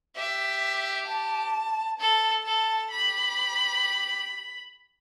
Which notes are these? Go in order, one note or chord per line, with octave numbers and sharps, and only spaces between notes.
G4 E5
A5
A4 A5
A4 A5
G4 B5